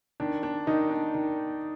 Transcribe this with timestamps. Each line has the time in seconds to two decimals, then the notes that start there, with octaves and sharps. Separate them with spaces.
0.20 D#3 D4
0.43 D4
0.67 D#3 D#4
0.90 D4
1.14 D#3